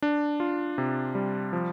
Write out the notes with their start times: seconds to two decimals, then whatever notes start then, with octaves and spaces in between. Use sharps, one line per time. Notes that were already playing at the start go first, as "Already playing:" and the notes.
0.02 D4
0.40 F4
0.78 C3
1.15 G3
1.53 F3